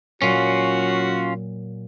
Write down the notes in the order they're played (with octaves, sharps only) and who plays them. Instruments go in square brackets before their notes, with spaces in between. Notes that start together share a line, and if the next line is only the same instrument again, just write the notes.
[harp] A#2 F#3 [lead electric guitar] C#4 F4 [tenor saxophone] F#4